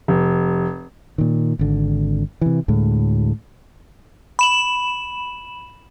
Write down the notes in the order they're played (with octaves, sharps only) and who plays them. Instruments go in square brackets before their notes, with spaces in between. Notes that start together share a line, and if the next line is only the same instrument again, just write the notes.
[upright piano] F1
[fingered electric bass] A#2 D#3
G#1 D3
C3 E3
D2 A2 G#3
[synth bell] B5 E7 F#7